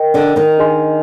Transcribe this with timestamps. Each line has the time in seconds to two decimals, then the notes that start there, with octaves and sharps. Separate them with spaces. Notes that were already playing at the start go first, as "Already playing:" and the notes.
Already playing: A#4 D#5 G5
0.14 D3 D4
0.36 D#3 D#4
0.58 D4 G#4 D#5 G#5 C6